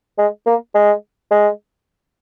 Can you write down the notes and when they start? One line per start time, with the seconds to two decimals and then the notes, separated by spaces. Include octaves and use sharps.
0.18 G#3
0.46 A#3
0.75 G#3
1.31 G#3